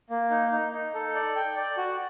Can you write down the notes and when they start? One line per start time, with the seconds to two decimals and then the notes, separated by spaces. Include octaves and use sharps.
0.10 A#3
0.31 D#4
0.52 D#4
0.73 D#4
0.94 A4
1.15 D5
1.36 G5
1.56 D5
1.77 F#4